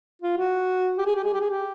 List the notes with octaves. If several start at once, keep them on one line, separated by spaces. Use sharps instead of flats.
F4
F#4
G4
G#4
G4
G#4
G4
G#4
G4